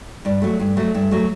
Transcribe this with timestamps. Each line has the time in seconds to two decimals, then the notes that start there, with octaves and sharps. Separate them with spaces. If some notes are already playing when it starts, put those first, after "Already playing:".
0.25 G2 D5
0.42 F#3 A3
0.60 G2
0.77 F#3 A3
0.94 G2 E5
1.11 F#3 A3